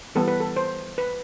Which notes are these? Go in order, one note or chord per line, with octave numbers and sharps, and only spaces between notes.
E3 G3 B3 A4
B4
A4
C5
B4